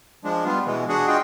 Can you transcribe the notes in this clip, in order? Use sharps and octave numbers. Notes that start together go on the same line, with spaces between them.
F3 G#3 D4
G3 B3 F4
B2 E3 G#3
D4 F#4 G#4 F#5
F4 F#4 G#4 D#5 G5